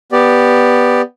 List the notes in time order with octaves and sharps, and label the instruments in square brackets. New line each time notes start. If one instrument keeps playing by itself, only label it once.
[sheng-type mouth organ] B3 G4 D5